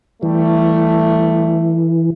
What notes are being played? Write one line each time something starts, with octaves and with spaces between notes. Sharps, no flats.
E3 G3 A3